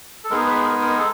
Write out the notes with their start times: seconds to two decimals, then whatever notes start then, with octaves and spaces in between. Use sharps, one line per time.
0.24 A4
0.30 G#3 B3 D#4 G#4 A#4
0.47 B4
0.65 A#4
0.81 A#4
0.98 A4